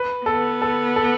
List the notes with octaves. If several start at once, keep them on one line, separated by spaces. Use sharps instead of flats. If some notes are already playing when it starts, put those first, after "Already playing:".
Already playing: B4
B3 A4
A4
A4